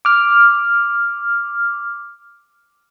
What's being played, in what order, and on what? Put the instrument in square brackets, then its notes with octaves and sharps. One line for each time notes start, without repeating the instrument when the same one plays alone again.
[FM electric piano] D6 F6